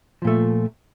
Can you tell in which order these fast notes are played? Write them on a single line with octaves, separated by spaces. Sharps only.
F3 A#2 A3